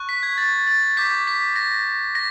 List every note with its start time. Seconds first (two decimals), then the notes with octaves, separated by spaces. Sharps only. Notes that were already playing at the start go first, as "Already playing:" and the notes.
Already playing: C#6 F#6
0.09 B6
0.23 G#6
0.38 A6
0.67 A6
0.97 D6 G6 B6
1.27 B6
1.56 A#6
2.15 A#6